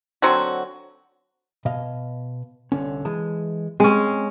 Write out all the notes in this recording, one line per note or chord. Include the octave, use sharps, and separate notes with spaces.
D3 F#3 C4 F#4
B2 D#5 F5
C2 D3 C#4
E3 G#3 A5
G#3 C4 C#4